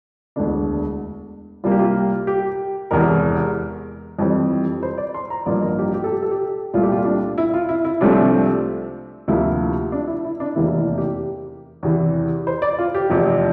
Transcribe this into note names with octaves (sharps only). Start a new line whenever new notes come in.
E1 D2 D3 D4
C2 C3 G3 A#3 F4
G4
F4
G4
E1 E2 C3 E3 A#4
F2 E3 G3 C4
C5
D5
C6
A#5
A1 G2 F3 A#3 D5
A#4
G4
G4
A4
G4
A4
G4
C2 A#2 A3 F4
G4
F4
D4
E4
F4
E4
E4
C2 C3 F3 A3 C4 D4
D2 C3 F3 A#3 E4
D4
E4
E4
D4
F1 E2 C3 E3 A#3 E4
E4
G4
E2 C3 E3
C5
D5
F4
G4
F1 E2 C3 F3